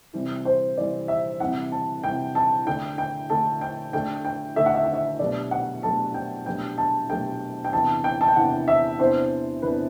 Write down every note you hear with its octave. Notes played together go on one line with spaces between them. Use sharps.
C3 E3 G3 C4
C5
C3 E3 G3 C4 D5
E5
C3 E3 G3 C4 F#5
A5
C3 E3 G3 C4 G5
A5
D3 A3 D4 F#4 G5
G5
D3 A3 D4 F#4 A5
G5
D3 A3 D4 F#4 G5
G5
D3 A3 D4 F#4 E5
F#5
E5
F#5
E5
B2 F#3 A3 D4 G4 D5
F#5
B2 F#3 A3 D4 G4 A5
G5
B2 F#3 A3 D4 G4 G5
A5
B2 F#3 A3 D4 G4 G5
G5
E2 C3 E3 B3 D4 A5
G5
A5
G5
E2 C3 E3 B3 D4 F#5
E5
E2 C3 E3 B3 D4 C5
E2 C3 E3 B3 D4 B4